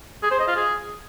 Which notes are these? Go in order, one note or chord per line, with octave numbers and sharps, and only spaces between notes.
G#4
C5
D#5
F4
G#4